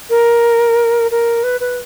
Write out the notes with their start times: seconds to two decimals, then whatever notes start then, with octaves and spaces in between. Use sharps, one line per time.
0.10 A#4
1.11 A#4
1.43 B4
1.60 B4